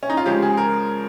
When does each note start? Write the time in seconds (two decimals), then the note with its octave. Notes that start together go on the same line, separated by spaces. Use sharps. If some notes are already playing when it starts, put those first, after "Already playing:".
0.03 C#4
0.10 D#4
0.17 F4
0.26 C#3 F3 G#3 G4
0.42 G#4
0.57 A#4